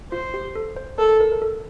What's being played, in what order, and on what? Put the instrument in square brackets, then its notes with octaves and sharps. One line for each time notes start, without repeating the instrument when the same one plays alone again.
[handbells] F4 [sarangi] C5
[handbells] G4
A4
C5
[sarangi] A4 [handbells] A#4
[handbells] A#4
A#4
A4